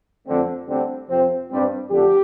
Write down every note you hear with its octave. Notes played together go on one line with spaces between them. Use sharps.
F2 D3 A3 C4
D2 D3 G3 C4
F2 C3 F3 C4
G2 G3 C4
F2 D3 A3 G4